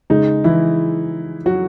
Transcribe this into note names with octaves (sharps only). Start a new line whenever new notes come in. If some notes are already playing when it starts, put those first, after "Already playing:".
C#3 G#3 D#4
E3 E4
F#3 F#4